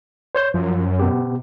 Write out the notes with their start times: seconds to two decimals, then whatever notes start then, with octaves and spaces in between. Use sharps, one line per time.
0.35 C5 C#5 G6
0.54 F#2 F3
1.00 B2 B3 G4